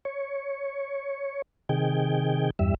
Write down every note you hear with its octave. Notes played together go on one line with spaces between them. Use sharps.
C#5
C3 D#3 G#4 G5
E2 G2 G3 E5